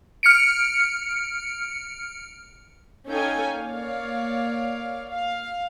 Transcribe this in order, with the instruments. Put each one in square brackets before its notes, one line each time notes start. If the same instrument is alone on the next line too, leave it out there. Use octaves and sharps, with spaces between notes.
[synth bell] F6 C#7 D7
[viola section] C#4 D#4 A4 F5 G5 G#5
A#3 C#5 D5 F5
F5